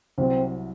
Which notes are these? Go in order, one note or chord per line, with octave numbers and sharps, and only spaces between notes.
C2 C3 F#3 C4